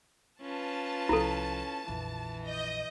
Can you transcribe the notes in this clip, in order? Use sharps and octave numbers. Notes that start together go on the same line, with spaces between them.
C#4 F4 B4 A5
C2 F3 E4 A4
A#1 F2 E3
D#5 G6